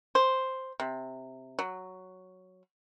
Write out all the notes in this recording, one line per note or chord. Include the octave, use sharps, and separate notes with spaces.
C5
C3
F#3